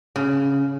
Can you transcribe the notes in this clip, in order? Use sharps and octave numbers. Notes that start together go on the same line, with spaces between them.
C#3